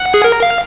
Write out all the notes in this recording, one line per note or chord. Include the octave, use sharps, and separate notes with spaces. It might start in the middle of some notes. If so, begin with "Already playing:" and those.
Already playing: F#5
G#4
A#4
F5